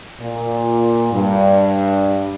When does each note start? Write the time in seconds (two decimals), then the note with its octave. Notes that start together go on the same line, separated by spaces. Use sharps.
0.20 A#2
1.12 G2